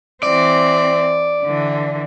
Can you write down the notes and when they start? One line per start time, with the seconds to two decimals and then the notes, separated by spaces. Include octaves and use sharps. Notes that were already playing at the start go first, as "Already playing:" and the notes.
0.23 E3 C4 D5
1.43 D3 E3